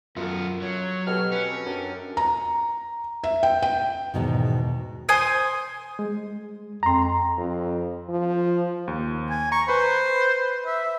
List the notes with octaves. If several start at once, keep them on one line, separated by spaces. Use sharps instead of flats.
F#2 B3 F4 F#4 A4 A#4
F#3 C#5
B2 G4 A4 F6
C#4 B4
C4
F#2 D4
A#5
E5
G5
G5
E2 G#2 B2 D#3
C5 G#5 D#6
G#3
F2 A#5 C6
F2
F3
D#2
G#5
A#5 C#6
B4 C5 B5
E5